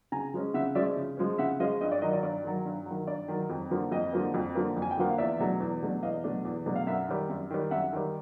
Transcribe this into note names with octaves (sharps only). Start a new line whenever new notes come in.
C#3 G#5 A#5
F3 G#3 C#4
C#3 E5 F#5
F3 G#3 C#4 D5 E5
C#3
F3 G#3 C#4
C#3 E5 F#5
F3 G#3 C#4 D#5 F5
G2 D#5
D5
D#3 F#3 D#5
D5
G2 D5
D#3 F#3
G2
D#3 F#3
G2 D5
D#3 F#3
F2
D3 F3 A#3
F2 D#5
D3 F3 A#3
F2
D3 F3 A#3
F2
G#5
G5
D3 F3 A#3 F#5
F5
E2 D5 E5
B2 F#3 A3 D4
E2
B2 F#3 A3 D4
E2 D#5 F5
B2 F#3 A3 D4
E2
B2 F#3 A3 D4
F5
F#2 E5 F#5
D#3 G3
F#2
D#3 G3
F#2 E5 F#5
D#3 G3